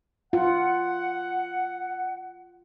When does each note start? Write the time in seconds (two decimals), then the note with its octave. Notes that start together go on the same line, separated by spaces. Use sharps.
0.33 F4 F#5